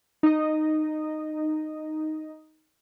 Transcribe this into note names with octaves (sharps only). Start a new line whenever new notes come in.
D#4 D#5